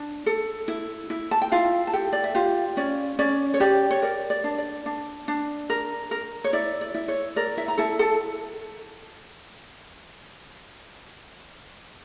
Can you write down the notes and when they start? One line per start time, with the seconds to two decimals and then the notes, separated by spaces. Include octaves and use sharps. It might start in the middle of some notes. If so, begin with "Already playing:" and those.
Already playing: D4
0.26 A4
0.68 E4
1.10 E4
1.31 A5
1.42 G5
1.52 E4 F4 F5
1.87 A5
1.93 G4 A4 G5
2.13 D5
2.24 E5
2.35 F4 G4 F5
2.77 C#4 D5
3.19 C#4 D5
3.54 C#5
3.60 G4 D5
3.91 C#5
4.02 A#4 D5
4.30 D5
4.44 D4
4.58 D5
4.86 D4
5.28 D4
5.70 A#4
6.11 A#4
6.44 C#5
6.53 E4 D5
6.81 D5
6.94 E4
7.08 C#5
7.36 A#4 D5
7.57 E4 E5
7.68 A#5
7.78 E4 A4 A5
7.99 A4 A5